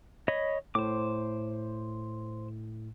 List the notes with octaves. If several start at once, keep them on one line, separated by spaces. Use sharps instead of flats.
C#5 D#5 B5
A2 C5 D6